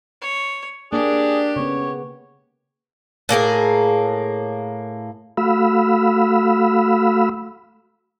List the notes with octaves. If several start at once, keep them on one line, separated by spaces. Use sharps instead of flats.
C#5
A#3 D4 G4 G#4
C#3 B3 C#5
A2 A#3 G4 G#4
A3 F#4 F5 B5 E6